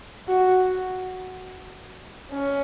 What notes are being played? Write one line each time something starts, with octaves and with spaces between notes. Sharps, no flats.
F#4
C#4